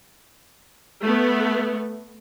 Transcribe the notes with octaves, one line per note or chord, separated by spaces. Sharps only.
A3 B3